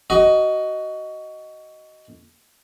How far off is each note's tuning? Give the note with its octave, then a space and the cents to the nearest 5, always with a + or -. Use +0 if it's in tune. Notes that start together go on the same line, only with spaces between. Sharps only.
F#4 +20 D#5 +5